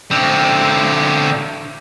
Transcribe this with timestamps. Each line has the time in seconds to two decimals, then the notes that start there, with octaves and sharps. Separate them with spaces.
0.11 D3 C4